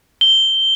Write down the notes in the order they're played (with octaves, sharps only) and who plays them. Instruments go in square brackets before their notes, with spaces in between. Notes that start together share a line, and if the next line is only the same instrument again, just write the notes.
[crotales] G7